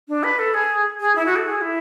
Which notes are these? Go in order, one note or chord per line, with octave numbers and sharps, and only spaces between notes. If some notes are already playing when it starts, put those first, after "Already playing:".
D4
B4
A4
G#4
G#4
E4
F#4
A4
G#4
E4